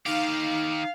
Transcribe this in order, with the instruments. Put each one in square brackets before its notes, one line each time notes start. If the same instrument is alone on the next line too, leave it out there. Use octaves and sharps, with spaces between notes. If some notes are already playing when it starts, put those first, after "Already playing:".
[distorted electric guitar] D#3 G4 [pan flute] D#4 [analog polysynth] F5